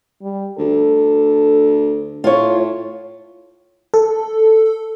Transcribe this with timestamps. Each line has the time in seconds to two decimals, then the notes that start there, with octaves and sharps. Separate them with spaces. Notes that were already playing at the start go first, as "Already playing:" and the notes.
0.22 G3
0.58 D2 A4
2.24 A2 F4 C#5
3.94 A4